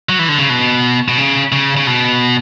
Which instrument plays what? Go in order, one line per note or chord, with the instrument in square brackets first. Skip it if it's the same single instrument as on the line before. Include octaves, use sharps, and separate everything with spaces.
[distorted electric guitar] F#3
E3
D3
C#3
B2
B2
C#3
C#3
C#3
B2